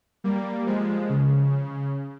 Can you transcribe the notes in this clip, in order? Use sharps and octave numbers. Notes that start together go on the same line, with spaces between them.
G3 A#3
F3 G#3
C#3